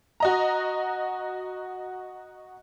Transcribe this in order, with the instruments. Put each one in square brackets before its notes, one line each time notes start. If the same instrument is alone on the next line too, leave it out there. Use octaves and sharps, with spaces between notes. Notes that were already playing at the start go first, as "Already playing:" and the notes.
[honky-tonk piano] F#4 D#5 A#5